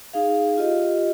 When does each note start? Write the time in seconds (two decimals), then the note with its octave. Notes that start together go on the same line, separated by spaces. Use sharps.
0.14 D#4 G#4 F5
0.58 F4 G4 D#5